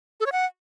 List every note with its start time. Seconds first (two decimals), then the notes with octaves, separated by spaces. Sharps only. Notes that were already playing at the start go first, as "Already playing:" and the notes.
0.20 A4
0.26 C#5
0.32 F#5